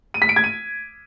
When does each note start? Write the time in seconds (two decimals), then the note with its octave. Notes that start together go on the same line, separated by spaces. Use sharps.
0.14 D#7
0.22 B6
0.29 D7
0.36 G#6
0.44 D#7